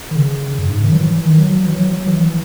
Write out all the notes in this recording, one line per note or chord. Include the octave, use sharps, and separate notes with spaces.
D#3
C#3
F#2
G#2
D#3
F#3
E3
E3
D#3
F#3
F#3
E3
F#3
F#3
E3
E3